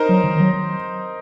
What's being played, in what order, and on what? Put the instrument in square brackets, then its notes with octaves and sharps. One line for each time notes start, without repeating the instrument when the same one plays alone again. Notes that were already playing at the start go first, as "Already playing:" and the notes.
Already playing: [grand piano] D#4 A#4 C5
[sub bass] F#3
D#3
F#3